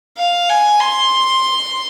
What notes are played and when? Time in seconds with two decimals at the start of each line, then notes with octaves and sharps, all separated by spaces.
0.18 F5
0.49 G#5
0.80 C6